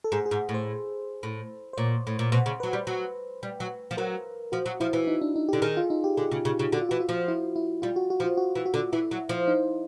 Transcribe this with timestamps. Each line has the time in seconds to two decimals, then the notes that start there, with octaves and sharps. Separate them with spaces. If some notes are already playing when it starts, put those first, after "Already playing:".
0.04 A4
0.12 G#2 G#4
0.26 G#4
0.31 G#2
0.49 A2
0.54 C5
1.23 A2
1.73 C5
1.77 A#2 C#5
2.07 A2
2.19 A#2
2.32 B2 C5
2.46 C#3
2.60 F#3 B4
2.73 G3
2.87 F#3
3.43 G3
3.60 F#3
3.91 F3
3.97 F#3 A#4
4.52 F3 F#4
4.66 F#3
4.80 F3 E4
4.93 E3
5.07 D#4
5.21 D4
5.36 D#4
5.49 D3 G4
5.62 D#3 G#4
5.77 F4
5.90 D#4
6.04 G4
6.17 D3 G#4
6.32 C#3
6.45 C#3
6.59 C#3
6.72 D3 F#4
6.81 F4
6.89 E3 F#4
7.00 F4
7.09 F3
7.28 E4
7.56 E4
7.82 G3 F4
7.96 F#4
8.10 F#4
8.20 F3
8.24 F4
8.37 F#4
8.55 E3
8.66 F#4
8.74 D3
8.93 E3 E4
9.11 F#3
9.29 F3
9.48 D#4